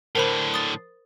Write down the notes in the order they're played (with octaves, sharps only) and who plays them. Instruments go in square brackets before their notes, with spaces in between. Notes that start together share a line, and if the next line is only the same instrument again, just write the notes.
[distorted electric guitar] A2 D3 [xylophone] A#4 C5 B5
[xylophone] D#6 A6